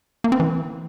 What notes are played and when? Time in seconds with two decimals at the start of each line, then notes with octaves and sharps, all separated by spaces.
0.24 A#3
0.32 C4
0.40 E3